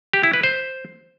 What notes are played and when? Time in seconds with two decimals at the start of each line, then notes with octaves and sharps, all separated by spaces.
0.13 G4
0.23 E4
0.33 B4
0.43 C5